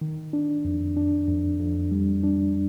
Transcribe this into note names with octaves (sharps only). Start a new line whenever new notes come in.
D#3
D4
F2
D4
F2
F2
G3
D4